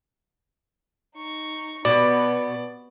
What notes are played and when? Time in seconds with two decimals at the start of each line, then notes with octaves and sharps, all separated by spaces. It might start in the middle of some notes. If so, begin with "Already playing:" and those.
1.16 D#4 C#6
1.85 B2 B3 D5